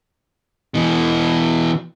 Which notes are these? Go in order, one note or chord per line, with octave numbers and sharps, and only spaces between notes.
B2 E3